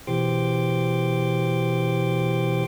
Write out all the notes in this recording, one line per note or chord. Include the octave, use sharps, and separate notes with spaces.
B2 E3 G4 C5 C6 D6